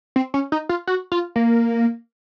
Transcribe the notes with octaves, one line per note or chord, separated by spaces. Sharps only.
C4
C#4
D#4
F4
F#4
F4
A#3